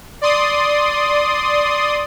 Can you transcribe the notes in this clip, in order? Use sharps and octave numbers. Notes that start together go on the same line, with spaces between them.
D5 C6 D#6